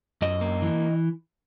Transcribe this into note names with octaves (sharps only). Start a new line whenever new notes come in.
F#2 D#5
A#3
E3